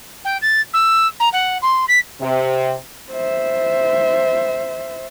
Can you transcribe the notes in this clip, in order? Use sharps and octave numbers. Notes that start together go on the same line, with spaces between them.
G5
A6
E6
A#5
F#5
C6
B6
C3
C5 E5